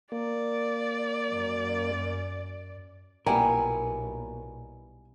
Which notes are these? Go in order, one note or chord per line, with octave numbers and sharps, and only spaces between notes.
A#3 D5
F#2
B1 A#2 G3 B3 E4 A#4 G#5